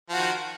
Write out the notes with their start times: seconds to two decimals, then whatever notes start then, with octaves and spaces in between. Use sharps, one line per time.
0.09 F3
0.13 F#4
0.17 D#3